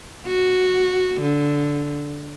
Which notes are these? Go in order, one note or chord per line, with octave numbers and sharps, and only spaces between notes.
F#4
D3